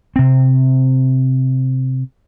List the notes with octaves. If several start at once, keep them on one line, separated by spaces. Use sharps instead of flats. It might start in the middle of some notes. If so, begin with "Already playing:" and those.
C3 C4